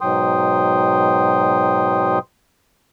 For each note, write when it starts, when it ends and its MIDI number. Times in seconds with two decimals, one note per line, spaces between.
0.01 2.19 44
0.01 2.19 47
0.01 2.19 54
0.01 2.19 79
0.01 2.19 84
0.01 2.19 87